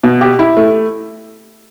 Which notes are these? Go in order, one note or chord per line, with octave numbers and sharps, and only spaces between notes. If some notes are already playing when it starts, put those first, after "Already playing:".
B2
G4
E4
A3